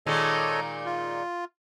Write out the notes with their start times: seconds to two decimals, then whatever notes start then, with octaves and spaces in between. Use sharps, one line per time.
0.07 A#2 D#3 G#3 A4 C#5 D#5
0.86 F4